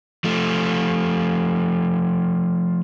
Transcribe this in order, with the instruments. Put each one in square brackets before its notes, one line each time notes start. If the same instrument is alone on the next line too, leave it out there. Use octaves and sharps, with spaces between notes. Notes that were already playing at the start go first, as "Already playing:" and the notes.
[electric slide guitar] F3 A3